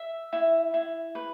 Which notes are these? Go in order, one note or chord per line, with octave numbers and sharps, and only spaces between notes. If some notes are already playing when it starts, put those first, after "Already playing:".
Already playing: E5
E4
E4
B4